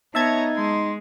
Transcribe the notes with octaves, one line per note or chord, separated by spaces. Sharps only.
B3 D#4 C#5 E5 A5 A#5 G#6
G#3 C6